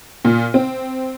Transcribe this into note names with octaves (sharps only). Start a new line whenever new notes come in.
A#2
C4